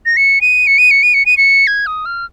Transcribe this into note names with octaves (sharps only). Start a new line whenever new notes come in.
A#6
C#7
D#7
C#7
D#7
C#7
D#7
C#7
D#7
C#7
G#6
D#6
F6